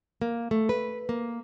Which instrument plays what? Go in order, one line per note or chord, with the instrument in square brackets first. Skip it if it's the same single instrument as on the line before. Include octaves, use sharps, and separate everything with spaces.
[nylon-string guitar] A#3
A3
B4
A#3